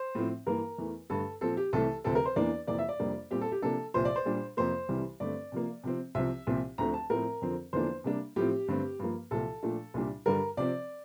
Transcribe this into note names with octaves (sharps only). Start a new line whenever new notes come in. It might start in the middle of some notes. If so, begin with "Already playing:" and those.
Already playing: C5
A2 F3 C4
G2 E3 A#3 A#4
E2 E3 A3
G2 D3 A3 A4
A#2 F3 C4 A4
G4
C2 C3 E3 A3 A4
D2 C3 F3 C4 A4
A#4
C5
E2 E3 A#3 D4 D5
F2 C3 E3 A#3 D5
E5
D5
F2 C3 G3 A#3 D4
A#2 G3 C4 G4
A4
G4
C3 F3 A#3 D4 A4
C2 A#2 F3 C5
D5
C5
A#2 G3 D4
F2 C3 F3 A#3 C5
C2 C3 E3 G3
G2 D3 A3 C4 D5
C3 F3 A#3
C3 F3 C4
C2 C3 F3 C4 E5
C2 A#2 F3 C4
D2 D3 F3 A3 C4 A#5
A5
A2 F3 C4 A#4
F2 D3 F3 C4
E2 D3 F3 A#3 D4 C5
C3 G3 A#3 D4
A2 F3 C4 G4
G2 D3 A3 C4
G2 F3 A#3
C2 A#2 F3 A4
A#2 F3 A3 D4
C2 A#2 G3 D4
G2 D3 G3 A#4
C3 F3 C4 D5